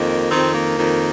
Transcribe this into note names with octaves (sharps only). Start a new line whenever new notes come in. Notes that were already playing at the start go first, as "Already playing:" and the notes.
Already playing: F2 D#3 A#3
F2 D#3 C4
A#3
F2 D#3